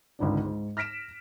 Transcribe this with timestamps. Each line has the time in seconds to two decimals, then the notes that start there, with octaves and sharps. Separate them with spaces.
0.19 G#1 C#2 D3 D4
0.44 G#2
0.77 F6 A#6 B6 D7 E7